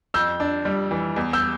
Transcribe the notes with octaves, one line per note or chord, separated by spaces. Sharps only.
F2 E6 G6
D4
G3
E3
E2
E6 G6